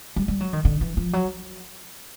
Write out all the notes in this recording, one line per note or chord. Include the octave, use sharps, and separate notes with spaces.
G3
G3
F#3
D#3
D3
E3
F3
F#3